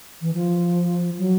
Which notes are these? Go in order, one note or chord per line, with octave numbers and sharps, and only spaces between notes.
E3
F3
F#3